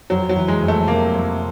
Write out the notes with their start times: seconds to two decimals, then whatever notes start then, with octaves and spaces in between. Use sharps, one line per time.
0.10 F2 F#3
0.29 F#3
0.36 E3
0.48 G#3
0.61 F2
0.68 A3
0.87 C3 A#3
1.14 F2